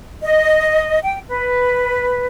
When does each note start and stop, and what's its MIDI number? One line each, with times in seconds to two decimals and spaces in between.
0.23 0.98 75
1.03 1.18 79
1.27 2.25 71